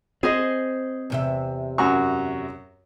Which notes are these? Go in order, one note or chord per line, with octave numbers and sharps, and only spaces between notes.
C4 G#4 C5 D#5
E2 C3 E5
F#2 F#4 C#6